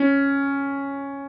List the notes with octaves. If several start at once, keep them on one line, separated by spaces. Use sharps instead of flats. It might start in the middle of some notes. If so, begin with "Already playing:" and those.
Already playing: C#4